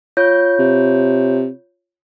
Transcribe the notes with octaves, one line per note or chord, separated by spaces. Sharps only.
F4 C#5 G6
C3